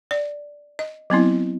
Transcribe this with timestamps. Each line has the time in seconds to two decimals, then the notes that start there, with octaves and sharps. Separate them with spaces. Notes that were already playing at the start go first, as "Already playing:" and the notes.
0.11 D5
0.79 D#5
1.10 F#3 B3 C4 E4